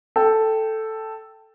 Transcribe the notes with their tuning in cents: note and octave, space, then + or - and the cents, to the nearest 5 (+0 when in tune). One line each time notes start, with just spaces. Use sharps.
A4 +0 G5 +0